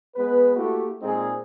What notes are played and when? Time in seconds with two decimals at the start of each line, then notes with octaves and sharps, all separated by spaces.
0.16 G#3 B3 B4
0.56 A3 A#3 E4 F#4 G4
1.02 A#2 G#3 C4 D#4 G#4